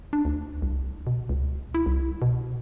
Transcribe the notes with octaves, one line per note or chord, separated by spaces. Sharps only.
D4
D2
C2
B2
C#2
E4
C2
B2